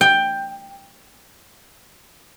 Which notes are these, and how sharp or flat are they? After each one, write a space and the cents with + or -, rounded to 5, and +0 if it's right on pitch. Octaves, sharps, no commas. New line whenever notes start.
G5 +10